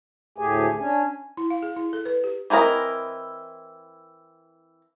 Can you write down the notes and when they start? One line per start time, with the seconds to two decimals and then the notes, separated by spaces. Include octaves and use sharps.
0.38 D2 A2 A3 G4 G#4 G#5
0.79 C#4 D4 G#5
1.37 E4
1.50 F5
1.63 G#4
1.76 E4
1.93 A4
2.05 B4
2.24 G4
2.50 E3 C4 E4 A#4 D#5